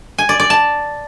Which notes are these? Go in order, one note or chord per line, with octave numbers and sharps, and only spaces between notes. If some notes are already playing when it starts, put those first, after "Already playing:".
G#5
D5
D5
A5